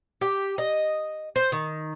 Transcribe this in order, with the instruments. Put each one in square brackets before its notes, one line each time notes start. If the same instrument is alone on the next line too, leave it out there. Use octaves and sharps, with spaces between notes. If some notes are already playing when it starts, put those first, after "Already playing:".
[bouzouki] G4
D#5
C5
D#3